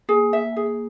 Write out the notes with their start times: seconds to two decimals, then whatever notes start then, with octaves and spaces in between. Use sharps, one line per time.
0.09 A#3 G#4
0.33 E5
0.56 G#4